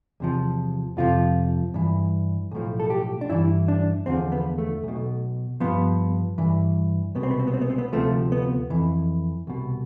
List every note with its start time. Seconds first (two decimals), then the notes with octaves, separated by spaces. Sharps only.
0.20 E2 C3 F3
0.97 F2 C3 F3 F4
1.74 G2 E3
2.51 B1 A2 F3
2.80 A4
2.90 G4
3.21 D4
3.30 G2 E3 E4
3.68 D4
4.06 E2 D3 F3 C4
4.32 B3
4.58 A3
4.83 B1 B2
5.60 G2 F3 B3
6.38 G2 E3
7.15 C2 B2 B3
7.23 C4
7.31 B3
7.39 C4
7.47 B3
7.54 C4
7.61 B3
7.70 C4
7.78 B3
7.93 D2 C3 F3 A3
8.32 B3
8.70 F2 E3
9.47 C2 B2